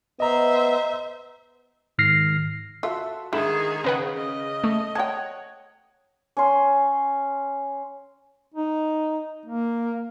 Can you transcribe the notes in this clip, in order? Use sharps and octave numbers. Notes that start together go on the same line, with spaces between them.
B3 C5 D#5 E5 A#5
G#2 D#3 F6 A#6 C7
F4 F#4 A4 E5
G#2 D3 D#3 E4 G#4 E7
C#3 A#4 B4 F#5
D#5
A3
C#5 F#5 G5 A5 G#6
C#4 C6
D#4
A#3